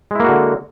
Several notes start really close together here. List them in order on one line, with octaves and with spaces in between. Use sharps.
G#3 E4 A#3 F#4 D3